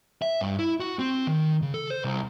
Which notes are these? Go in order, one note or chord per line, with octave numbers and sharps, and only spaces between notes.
E5
G2
E4
F#4
C4
D#3
C#3
A4
C5
C2